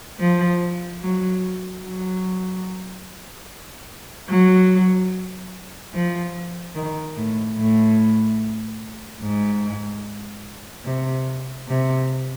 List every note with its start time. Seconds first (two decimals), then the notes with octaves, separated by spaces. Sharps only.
0.19 F3
1.02 F#3
1.84 F#3
4.29 F#3
5.94 F3
6.75 D#3
7.17 A2
7.58 A2
9.22 G#2
10.86 C3
11.68 C3